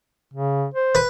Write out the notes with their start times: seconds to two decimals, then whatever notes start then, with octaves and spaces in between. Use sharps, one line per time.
0.34 C#3
0.74 C5
0.95 B4